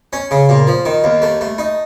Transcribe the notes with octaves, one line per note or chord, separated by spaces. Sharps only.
C#4
C#3
A#2
F3
D#3
D#2
A3
A3
D#4